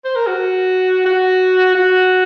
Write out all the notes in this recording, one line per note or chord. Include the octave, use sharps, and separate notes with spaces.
C5
A#4
F#4
F#4
F#4